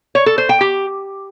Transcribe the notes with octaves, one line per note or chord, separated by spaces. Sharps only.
C#5
A4
C5
G5
G4